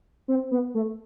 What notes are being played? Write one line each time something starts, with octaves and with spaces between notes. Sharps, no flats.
C4
B3
A3